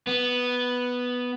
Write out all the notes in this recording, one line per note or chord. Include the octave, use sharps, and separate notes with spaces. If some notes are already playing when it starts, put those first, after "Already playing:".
B3